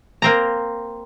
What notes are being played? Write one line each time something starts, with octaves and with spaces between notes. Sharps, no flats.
A#3 C4 A#5